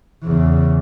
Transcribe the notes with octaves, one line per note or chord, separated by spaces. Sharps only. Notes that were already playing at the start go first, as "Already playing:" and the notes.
E2 C#3